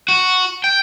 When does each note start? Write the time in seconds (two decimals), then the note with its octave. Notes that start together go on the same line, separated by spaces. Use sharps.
0.08 F#4
0.64 G5